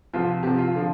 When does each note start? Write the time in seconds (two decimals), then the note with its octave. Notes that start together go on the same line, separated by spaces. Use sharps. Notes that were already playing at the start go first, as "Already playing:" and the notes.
0.13 C2 C3 F3 F4
0.43 C2 C3 F3 G4
0.58 F4
0.75 D3 F3